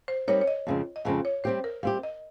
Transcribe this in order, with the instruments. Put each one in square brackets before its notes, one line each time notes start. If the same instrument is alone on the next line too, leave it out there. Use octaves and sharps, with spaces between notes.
[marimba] C5
[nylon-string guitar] G3 C4 D#4 A#4 [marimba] C#5
[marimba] C#5
D#5
[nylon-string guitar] F2 C#3 G#3 C4
[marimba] D#5
[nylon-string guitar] F2 C#3 G#3 C4 [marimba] F5
[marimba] C#5
[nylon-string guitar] G3 C4 G4 [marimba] C5
[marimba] A#4
[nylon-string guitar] G3 C4 G4 [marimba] F5
[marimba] D#5